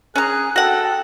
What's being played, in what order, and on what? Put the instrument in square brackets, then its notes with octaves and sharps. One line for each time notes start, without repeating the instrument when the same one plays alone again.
[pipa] C#4 A#5 [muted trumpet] G#4 [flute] F#6
[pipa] F#4 F#5 [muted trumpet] A4 [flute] G5